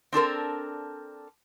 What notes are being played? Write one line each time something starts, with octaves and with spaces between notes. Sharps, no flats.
C4 D4 A4 A#4